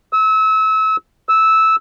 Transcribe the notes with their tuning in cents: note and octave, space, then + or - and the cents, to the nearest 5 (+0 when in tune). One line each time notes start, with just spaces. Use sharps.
E6 -30
E6 -10